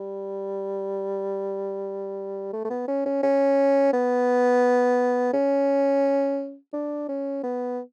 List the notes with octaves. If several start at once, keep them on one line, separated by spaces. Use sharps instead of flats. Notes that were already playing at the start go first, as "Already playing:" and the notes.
Already playing: G3
A3
A3
B3
C#4
C#4
C#4
B3
C#4
D4
C#4
B3